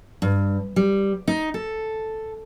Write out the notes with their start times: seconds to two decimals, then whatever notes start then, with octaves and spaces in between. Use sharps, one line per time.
0.22 G2
0.76 G3
1.28 D#4
1.54 A4